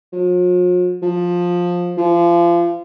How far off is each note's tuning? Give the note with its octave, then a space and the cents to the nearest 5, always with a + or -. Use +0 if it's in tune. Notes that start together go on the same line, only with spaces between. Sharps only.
F3 +45
F3 +15
F3 -30